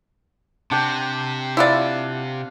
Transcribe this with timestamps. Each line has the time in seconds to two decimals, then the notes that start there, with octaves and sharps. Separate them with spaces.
0.71 C3 D4 F#5 G5
1.57 E4 F4 D5 F5 F#5